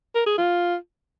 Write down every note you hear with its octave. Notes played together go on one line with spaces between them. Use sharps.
A#4
G#4
F4